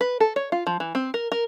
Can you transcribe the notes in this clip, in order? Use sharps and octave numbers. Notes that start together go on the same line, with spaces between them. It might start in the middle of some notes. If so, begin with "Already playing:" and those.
B4
A4
C#5
F4
F3
E3
C4
A#4
A#4